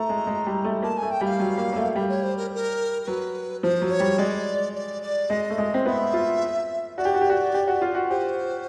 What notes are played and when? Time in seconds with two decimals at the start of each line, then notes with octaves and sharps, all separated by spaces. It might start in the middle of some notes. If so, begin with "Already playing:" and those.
Already playing: A3 A#5
0.09 G#3
0.27 G#3
0.47 G3
0.64 A3
0.83 A#3 A5
0.98 A3 G#5
1.11 G5
1.21 G3
1.26 F5
1.40 F#3
1.58 A#3
1.73 A#3
1.76 A3
1.96 G3
2.09 C#5
2.23 C5
2.37 A#4
2.55 A#4
3.03 A#4
3.07 F#3 B4
3.63 F3 C5
3.82 F#3
3.91 C#5
4.00 G3
4.18 G#3 D5
4.75 D5
5.03 D5
5.30 G#3 D#5
5.50 A3
5.58 G#3
5.74 C4
5.86 B3 E5
6.14 F4
6.98 F#4 D5
7.05 G4
7.14 F#4
7.21 G4
7.30 F#4
7.54 G4
7.67 F#4
7.82 F4
7.95 F#4
8.10 G4 C5